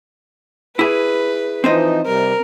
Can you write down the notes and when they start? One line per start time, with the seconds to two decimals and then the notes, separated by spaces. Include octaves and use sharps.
0.79 E4 G#4 B4
1.64 E3 F3 C4 D#4 C5 D#5
2.06 C3 G3 A#4